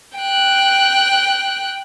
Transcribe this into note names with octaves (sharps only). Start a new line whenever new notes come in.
G5 F#6